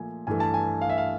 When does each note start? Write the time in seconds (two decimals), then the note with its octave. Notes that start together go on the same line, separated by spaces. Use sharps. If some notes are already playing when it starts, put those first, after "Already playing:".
Already playing: A#2 F3 A3 G#5
0.27 G2 E3 A3 G#5
0.40 A5
0.54 G#5
0.82 F5
0.90 E5
0.98 F5